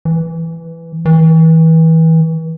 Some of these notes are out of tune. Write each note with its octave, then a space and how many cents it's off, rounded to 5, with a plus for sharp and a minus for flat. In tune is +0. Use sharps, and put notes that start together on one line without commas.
E3 +5
E3 -30